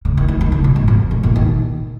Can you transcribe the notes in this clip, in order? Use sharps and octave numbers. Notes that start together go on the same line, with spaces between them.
C#3
D#3
F3
D#3
C#3
A#2
G#2
F2
A#2
A#2
D#3